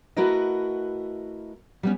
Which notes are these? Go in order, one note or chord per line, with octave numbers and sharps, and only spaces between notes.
A3 E4 F#4 A#4 B4 D#5
G3 B3 C#4